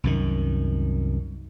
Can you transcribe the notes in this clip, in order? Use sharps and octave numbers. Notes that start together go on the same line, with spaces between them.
C2 F#2 D#3